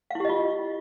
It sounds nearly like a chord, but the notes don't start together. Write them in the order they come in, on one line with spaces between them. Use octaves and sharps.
F5 E4 G4 D#5 F4